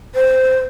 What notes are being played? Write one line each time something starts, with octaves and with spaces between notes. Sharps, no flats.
C5